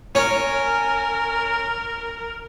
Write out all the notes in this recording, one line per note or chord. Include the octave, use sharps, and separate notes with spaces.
C#4 A#4